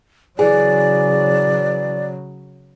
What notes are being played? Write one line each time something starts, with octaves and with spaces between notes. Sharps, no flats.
C#3 E3 F#3 G#4 D5